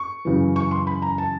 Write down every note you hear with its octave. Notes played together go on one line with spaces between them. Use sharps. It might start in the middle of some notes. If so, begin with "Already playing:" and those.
Already playing: C#6
F#2 C#3 E3
C#6
C6
B5
A#5
A5